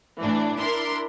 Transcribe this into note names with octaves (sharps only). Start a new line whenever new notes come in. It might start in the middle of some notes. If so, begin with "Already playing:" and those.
A2 E3 D4
D4 E4 A#4 C6